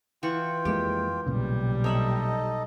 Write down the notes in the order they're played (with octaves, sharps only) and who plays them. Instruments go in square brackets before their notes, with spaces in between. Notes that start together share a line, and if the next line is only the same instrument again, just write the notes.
[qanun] E3 F#5 C#6 [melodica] F4 G5
[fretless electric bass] F2 G#3 A#3 [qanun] G4
[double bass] B1 G3 [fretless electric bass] A#2 C#3
[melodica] D#4 A4 D#5 [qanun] C#5 E5 B5